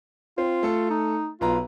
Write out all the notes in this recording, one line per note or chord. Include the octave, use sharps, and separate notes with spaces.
C4 F4
A3 A4
D#4
B1 F4 B4 A#5